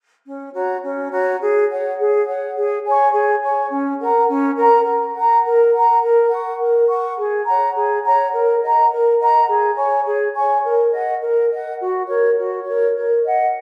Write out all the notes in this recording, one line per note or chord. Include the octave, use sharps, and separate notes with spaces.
C#4
F#4 C#5 A#5
C#4
F#4 C#5 A#5
G#4
C#5 F#5
G#4
C#5 F#5
G#4
C#5 G#5 C#6
G#4
C#5 G#5 C#6
C#4
A#4 F#5 A#5
C#4
A#4 F#5 A#5
A#4
F#5 A#5
A#4
F#5 A#5
A#4
F#5 C#6
A#4
F#5 C#6
G#4
C#5 F#5 A#5
G#4
C#5 F#5 A#5
A#4
D#5 F#5 A#5
A#4
D#5 F#5 A#5
G#4
C#5 G#5 C#6
G#4
C#5 G#5 C#6
A#4
D#5 F#5
A#4
D#5 F#5
F#4
A#4 C#5
F#4
A#4 C#5
A#4
D#5 F#5